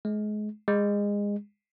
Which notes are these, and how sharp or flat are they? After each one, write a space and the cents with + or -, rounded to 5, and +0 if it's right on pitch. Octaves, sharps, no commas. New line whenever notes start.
G#3 +30
G#3 -25